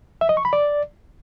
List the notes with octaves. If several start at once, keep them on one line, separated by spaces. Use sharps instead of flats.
E5
D#5
C#6
B5
D5